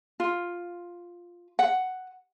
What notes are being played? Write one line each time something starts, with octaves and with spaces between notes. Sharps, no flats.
F4
F#5